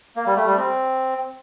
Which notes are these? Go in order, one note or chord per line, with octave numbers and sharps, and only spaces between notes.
A#3
G3
A3
G3
C4